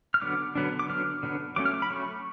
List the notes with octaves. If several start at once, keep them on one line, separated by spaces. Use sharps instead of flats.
F6
D3 F#3 B3 D4 D6
D3 F#3 B3 D4
D6
D3 F#3 B3 D4 F6
D3 F#3 B3 D4
F#3 A3 C#4 D6
F6
D6
B5
F#3 A3 C#4 C#6